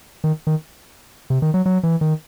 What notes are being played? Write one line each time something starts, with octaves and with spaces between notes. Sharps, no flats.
D#3
D#3
C3
D#3
F#3
F#3
E3
D#3